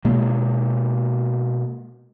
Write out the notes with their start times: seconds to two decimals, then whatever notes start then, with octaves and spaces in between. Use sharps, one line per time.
0.05 B2 G#3 A#3